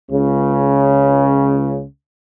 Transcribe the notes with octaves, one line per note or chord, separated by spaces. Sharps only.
C#2 C#3